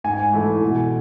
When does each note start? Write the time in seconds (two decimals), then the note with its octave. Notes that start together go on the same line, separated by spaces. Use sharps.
0.04 G#2 G#5
0.33 E3 A3
0.62 B2